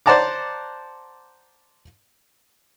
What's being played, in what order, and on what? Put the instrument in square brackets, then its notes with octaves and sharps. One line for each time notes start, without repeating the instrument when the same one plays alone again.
[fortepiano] C5 D5 F#5 A5 A#5 D6